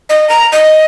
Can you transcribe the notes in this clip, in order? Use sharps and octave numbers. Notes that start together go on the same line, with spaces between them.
D#5
A#5
D#5